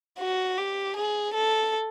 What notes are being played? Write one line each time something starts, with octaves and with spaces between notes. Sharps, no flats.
F#4
G4
G#4
A4